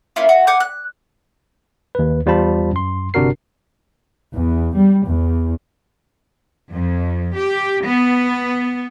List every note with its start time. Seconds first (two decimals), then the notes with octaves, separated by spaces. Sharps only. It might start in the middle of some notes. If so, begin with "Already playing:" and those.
0.16 A#3 C#4 E4 F4
0.29 F#4
0.47 F#5 G#5 D6 G6
0.60 F#6
1.95 D#2 B4
2.26 E2 G3 F4 C5 A5 B5
2.72 F#2 C6
3.14 G1 C3 D4 F#4 A#4 C7
4.34 E2
4.75 G3
5.04 E2
6.73 F2
7.37 G4
7.84 B3